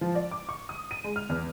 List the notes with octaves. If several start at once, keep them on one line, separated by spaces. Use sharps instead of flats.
F3
D5
D6
C#6
D#6
D#7
G#3
F6
E2